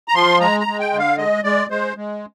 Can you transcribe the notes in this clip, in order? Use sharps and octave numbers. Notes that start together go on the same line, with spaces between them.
A#5
F3 C6
G#3 A#5
A#5
G#3
G5
D3
F5
G#3 D#5
G#3 D5
G#3 C5
G#3